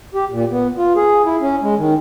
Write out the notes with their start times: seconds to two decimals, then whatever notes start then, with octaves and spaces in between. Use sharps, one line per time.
0.14 G4
0.30 A#2
0.51 B3
0.77 F4
0.96 G#4
1.25 E4
1.41 C#4
1.62 G#3
1.76 D#3